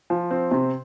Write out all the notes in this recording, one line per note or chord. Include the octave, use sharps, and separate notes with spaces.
F3
C4
C3